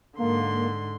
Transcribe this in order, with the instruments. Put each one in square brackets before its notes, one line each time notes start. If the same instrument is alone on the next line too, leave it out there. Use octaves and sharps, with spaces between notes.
[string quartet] G#2 D3 C6 [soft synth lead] A#3